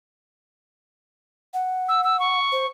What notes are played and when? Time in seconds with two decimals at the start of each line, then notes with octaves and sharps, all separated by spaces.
1.54 F#5
1.89 E6
2.04 E6
2.20 C#6
2.52 C5